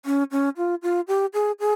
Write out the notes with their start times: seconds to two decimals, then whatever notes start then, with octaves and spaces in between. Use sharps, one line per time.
0.05 C#4
0.31 C#4
0.57 F4
0.83 F4
1.08 G4
1.34 G#4
1.60 G#4